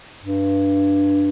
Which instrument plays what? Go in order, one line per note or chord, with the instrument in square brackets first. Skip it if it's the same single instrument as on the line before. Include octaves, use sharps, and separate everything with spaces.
[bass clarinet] G2